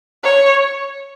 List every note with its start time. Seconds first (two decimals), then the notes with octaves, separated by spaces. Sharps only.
0.24 C#5